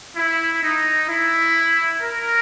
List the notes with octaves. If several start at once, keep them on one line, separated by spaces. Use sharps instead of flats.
E4
D#4
E4
A#4